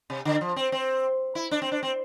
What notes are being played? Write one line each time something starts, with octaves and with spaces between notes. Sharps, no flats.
C3
D3
F3
C4
C4
E4
D4
C4
D4
C4